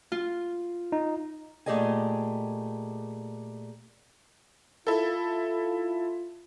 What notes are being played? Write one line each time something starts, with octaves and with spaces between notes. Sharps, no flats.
F4
D#4
A#2 A3 G4 G#4 D#5 G#5
E4 F4 A4